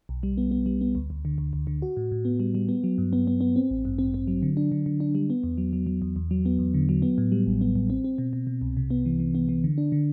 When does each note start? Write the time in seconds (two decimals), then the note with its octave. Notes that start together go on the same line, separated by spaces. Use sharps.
0.09 B1
0.23 G3
0.38 B3
0.51 B3
0.66 G3
0.81 B3
0.95 D2
1.10 D2
1.25 D3
1.38 D2
1.53 D2
1.67 D3
1.82 F#4
1.97 A2
2.12 A2
2.25 B3
2.40 G3
2.55 G3
2.69 B3
2.84 F#3
2.98 G2
3.13 B3
3.27 B3
3.41 B3
3.56 C4
3.70 A1
3.85 G2
3.98 C4
4.14 C4
4.27 F#3
4.42 D3
4.57 D4
4.72 D3
4.86 D3
5.00 D4
5.15 G3
5.30 B3
5.44 E2
5.58 F#3
5.73 F#3
5.87 F#3
6.02 E2
6.16 E2
6.31 F#3
6.46 B3
6.59 E2
6.74 D3
6.89 F#3
7.02 B3
7.18 A2
7.32 G3
7.47 A1
7.61 B3
7.76 A1
7.90 C4
8.04 C4
8.18 B2
8.33 B2
8.47 B2
8.61 C2
8.77 C3
8.90 B3
9.06 E3
9.19 E3
9.35 B3
9.49 E3
9.64 D3
9.78 D4
9.92 D3